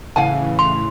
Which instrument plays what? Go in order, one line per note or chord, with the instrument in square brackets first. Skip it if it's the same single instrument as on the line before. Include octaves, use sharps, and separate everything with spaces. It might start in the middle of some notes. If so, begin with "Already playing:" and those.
[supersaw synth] A2 C#3 E3 [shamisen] C#4 F#5 A5 [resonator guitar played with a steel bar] F5 G#5
[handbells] C6